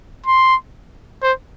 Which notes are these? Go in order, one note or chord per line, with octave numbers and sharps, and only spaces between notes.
C6
C5